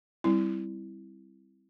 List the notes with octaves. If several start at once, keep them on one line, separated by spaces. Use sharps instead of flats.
G3 C4 E4